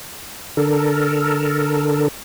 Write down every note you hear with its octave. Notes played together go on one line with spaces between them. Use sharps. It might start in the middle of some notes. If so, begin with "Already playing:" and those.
D3 A4 A#4